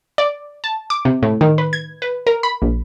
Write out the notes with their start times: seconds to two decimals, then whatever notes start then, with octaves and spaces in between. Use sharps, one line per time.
0.18 D5
0.64 A5
0.90 D6
1.05 C3
1.23 A2
1.41 D#3
1.58 B4
1.73 G#6
2.02 B4
2.27 A#4
2.43 B5
2.62 A#1